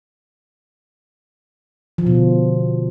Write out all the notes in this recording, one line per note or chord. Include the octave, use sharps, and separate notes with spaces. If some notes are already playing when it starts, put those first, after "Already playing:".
F3
B2
D3